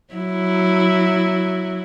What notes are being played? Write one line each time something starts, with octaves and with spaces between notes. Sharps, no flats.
F#3 E4